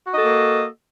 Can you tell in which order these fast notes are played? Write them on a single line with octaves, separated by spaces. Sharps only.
F#4 D#5 A4 A#3